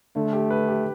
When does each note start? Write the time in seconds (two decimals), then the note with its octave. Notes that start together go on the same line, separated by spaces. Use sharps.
0.16 D3 A3
0.33 G4
0.50 B4
0.68 G4